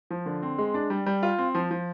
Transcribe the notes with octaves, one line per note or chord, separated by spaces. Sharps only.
F3
D3
C4
G#3
D4
G3
G3
F4
C4
F3
F3